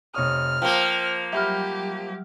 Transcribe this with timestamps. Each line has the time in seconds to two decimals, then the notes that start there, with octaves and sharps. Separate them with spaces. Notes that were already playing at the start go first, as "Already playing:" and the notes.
0.14 F1 C#5 D#6 F6
0.62 F3 A#3 G5 G7
1.33 F#3 G3 G4 E5 B5 F6